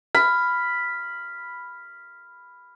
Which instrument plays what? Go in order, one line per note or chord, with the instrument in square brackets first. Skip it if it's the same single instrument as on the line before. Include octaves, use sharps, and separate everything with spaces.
[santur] B5 [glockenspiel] F6